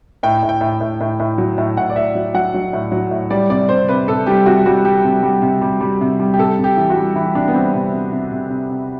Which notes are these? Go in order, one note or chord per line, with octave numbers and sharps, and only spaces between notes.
A2 G5
A2
G5
A2
A2
A2
A2
F#3
A2
A2 F#5
D5
A2 E5
F#3
F#3 F#5
F#3
A2
F#3
A2
G3 D5
C3 D5
C3 C5
C3 B4
C3 A4
G3 G4
C3 F#4
G3 F#4
G3 G4
C3
G3
C3
G3
G3
C3
G3
G4
C3 A4
C3
G4
E3
F#4
G3
E3 E4
C3 D4
B3
G3 C4
C3
C3
C3
C3
C3
C3